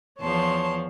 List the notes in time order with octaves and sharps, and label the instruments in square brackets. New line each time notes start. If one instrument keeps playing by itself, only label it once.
[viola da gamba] E2 F3 [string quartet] C#5 A5 C6